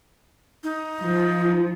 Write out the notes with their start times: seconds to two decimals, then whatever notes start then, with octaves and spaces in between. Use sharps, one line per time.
0.64 D#4
1.01 F3